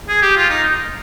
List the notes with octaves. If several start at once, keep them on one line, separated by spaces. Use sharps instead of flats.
G#4
G4
F4
D#4